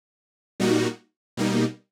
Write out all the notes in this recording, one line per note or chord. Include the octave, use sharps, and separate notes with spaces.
A#2 G3 A#3 D#4 F#4
B2 G3 A#3 D#4